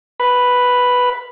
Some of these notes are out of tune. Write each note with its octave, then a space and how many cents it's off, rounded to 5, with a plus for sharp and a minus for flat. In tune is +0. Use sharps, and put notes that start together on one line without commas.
B4 +0 B5 +0